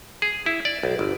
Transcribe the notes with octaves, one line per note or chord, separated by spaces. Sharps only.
G#4
E4
D5
B1
G1